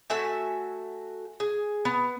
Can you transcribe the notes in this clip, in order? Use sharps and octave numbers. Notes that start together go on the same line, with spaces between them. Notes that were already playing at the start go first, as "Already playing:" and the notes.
A3 F#4 E5 G#5
G#4
B3